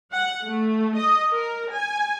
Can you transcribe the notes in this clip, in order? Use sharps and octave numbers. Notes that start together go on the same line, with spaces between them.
F#5
A3
D#5
A#4
G#5